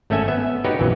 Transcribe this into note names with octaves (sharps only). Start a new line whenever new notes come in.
G#1 A3 C#4 A4 E5 G#5
B3 E5
D#4 F#4 G4 B4 C#5
A#1 F2 E3 F#3